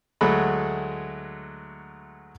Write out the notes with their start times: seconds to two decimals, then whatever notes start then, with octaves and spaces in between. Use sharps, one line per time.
0.21 D2 F#3 G#3 A3 B5